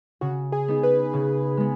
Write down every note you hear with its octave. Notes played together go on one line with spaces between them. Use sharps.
C#3 F#4
G#4
B3 D#4
B4
C#3
G#3 B3